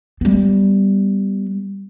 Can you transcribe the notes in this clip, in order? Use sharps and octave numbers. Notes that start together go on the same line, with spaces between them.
G3 B3